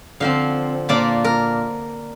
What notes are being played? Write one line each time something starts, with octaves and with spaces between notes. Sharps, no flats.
D3 F3 C4 F5
A#2 A#3 D4 F4 D5
A#4